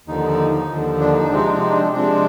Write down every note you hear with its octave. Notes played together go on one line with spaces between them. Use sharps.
D#2 D3 F3 D#4
D#4
D#4
D#2 D3 F3
D4
D#4
D4
C3 F3 G#3 C4 D#4
D4
D#4
D4
C3 F3 G#3 C4 D4